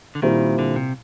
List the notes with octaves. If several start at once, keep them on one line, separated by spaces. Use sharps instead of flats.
D3
A#2 D#3 G3 C4 E4
D3
C3